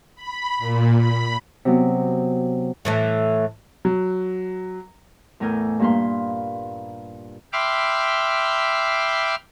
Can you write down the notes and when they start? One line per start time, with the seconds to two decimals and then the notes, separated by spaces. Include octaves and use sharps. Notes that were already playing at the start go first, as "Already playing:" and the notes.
0.16 B5
0.59 A#2
0.98 B5
1.65 C3 F#3 B3
2.85 A2 E3 A3
3.85 F#3
5.40 E2 A2 A3 A#4 G#5 G6
5.79 G2 A#2 A#3 B4 F5 C6
7.53 E5 G5 B5 C6 D6 F6